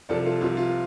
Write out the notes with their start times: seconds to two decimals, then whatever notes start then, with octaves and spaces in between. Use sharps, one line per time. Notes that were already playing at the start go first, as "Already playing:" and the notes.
0.09 C2 C3 F3 A4 D5
0.25 F4 A4
0.41 C2 C3 F3 F4
0.57 F4